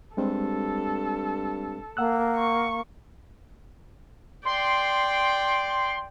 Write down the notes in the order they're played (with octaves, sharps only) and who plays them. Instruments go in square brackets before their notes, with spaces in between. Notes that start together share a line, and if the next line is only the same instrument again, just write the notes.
[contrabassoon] G2 [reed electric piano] G3 G#3 C4 [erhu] A4
[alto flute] A#3 [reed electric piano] F#5 E6 F#6
[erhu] C#6
[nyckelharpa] D5 G5 [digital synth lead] C6